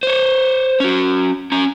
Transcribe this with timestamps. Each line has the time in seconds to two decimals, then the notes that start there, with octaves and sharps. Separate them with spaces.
0.03 C5 C#5
0.80 C#4 F#4
1.52 C#4 A#5